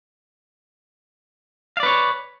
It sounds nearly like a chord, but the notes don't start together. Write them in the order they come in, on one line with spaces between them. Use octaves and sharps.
F5 D5 B4 C#5